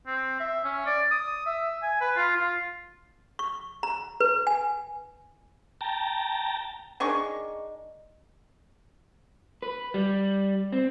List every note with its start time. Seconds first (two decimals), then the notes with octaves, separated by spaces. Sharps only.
0.06 C4
0.40 E5
0.64 C#4
0.86 D5
1.11 D#6
1.47 E5
1.83 G#5
2.01 B4
2.16 F4
2.37 F4
3.39 C#6
3.83 A#5
4.20 B4
4.47 G#5
5.81 G5 A5 A#5
7.00 D#3 G#3 D4 C#6
9.62 B4
9.94 G3
10.73 C4